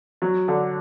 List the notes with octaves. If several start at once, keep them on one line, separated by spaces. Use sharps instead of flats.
F#3
D3